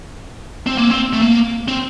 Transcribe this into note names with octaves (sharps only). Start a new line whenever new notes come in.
C4
A#3
C4
A3
A#3
C4